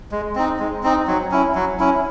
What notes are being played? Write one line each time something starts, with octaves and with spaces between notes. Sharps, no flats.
G#3
C4 D#4
G#3
C4 D#4
F#3
C#4 E4
F#3
C#4 E4